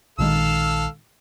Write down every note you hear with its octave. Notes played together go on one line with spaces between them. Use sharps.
A#1 D#3 G#3 A4 F5 E6